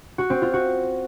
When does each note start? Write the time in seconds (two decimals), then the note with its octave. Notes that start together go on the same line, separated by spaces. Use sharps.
0.18 F#4
0.30 C4
0.42 F4
0.53 F#4